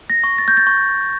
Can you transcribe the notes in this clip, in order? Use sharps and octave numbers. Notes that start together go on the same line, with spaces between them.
A#6
C#6
A6
G6
A6
C#6 G6